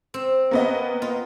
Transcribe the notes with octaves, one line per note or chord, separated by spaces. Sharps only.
C4
A#3 B3 D#5
F4